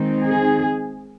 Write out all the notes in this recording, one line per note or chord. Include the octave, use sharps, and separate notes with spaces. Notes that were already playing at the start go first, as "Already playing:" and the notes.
Already playing: D#3 G#3 C4 D#4
G#4